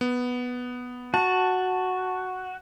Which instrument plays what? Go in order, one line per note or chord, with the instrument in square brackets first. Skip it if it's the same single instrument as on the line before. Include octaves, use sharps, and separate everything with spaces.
[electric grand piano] B3
[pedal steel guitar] F#4 [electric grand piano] A5